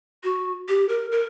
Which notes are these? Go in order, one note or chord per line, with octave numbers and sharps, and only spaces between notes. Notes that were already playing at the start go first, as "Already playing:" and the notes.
F#4
G4
A#4
A#4